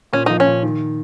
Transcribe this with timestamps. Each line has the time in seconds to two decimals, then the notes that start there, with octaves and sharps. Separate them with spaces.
0.13 A#2 C#4
0.26 F3 D#4
0.40 C#4
0.47 A#2
0.63 D#3